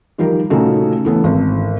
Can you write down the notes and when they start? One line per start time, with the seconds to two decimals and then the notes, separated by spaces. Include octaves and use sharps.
0.18 D#3 F3 G3 G4 A#4
0.50 A#2 C#3 A3 C#4 D#4 F#4
1.05 E3 A3 B3 C#4
1.24 G#1